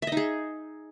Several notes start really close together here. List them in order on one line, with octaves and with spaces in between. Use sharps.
E5 D#5 D#4 G#4